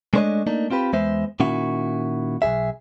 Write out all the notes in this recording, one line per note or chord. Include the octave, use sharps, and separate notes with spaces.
G#3 A3 D4 C5 C#5 D#5
A3 A#3 D4 D#4
C4 F4 G4 B4
E2 G#3 B3 C5 E5
A#2 D#3 C#4 E4 F#4
B1 G#2 G#4 E5